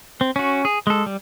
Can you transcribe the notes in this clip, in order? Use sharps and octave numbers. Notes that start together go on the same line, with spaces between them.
C4
C#4 F#4
G#4
G#3 A4
G3